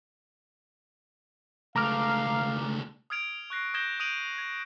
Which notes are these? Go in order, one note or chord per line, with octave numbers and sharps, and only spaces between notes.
C#2 A3 F5 A#5 D6 F6
D#6 F6 G#6 D7 F7
C#6 F#6 A#6 C7
D#6 G6 G#6 A#6 E7 G7
D#6 G6 D7 D#7 F7 F#7
G#6